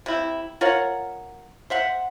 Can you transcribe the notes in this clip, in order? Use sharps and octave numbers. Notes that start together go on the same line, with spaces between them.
C3 E4
F4 A#4 C#5 F#5
C5 E5 F#5